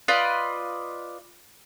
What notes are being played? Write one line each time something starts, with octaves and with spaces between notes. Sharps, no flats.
F4 B4 D5 D#5